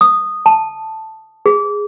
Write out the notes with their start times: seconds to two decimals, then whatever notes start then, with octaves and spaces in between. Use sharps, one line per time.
0.01 D#6
0.46 A5
1.46 G#4